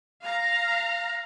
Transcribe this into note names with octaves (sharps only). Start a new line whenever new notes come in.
F5 A#5